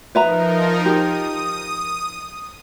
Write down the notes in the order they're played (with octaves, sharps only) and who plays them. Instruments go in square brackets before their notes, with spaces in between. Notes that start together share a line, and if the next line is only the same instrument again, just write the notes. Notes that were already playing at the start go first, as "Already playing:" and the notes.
[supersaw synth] F3 D#4 A#4 [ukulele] B4 E5 A#5
[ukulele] G4 [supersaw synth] D#6